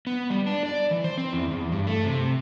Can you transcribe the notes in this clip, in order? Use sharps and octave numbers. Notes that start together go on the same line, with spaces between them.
B3
G3
D4
D5
E3
C5
C4
E2
E2
G2
A3
C3